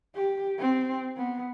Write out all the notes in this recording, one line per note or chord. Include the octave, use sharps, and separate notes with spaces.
G4
C4
B3